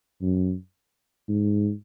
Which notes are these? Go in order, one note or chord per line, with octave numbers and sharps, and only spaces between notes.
F#2
G#2